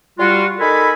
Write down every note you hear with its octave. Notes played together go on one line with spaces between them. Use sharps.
G3 F4 F#4
D#4 A4 A#4 G#5 B5